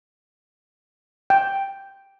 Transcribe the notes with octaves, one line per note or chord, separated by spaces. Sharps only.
G5